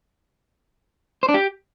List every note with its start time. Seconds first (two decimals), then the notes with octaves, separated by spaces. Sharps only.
1.23 C5
1.29 D4
1.34 G4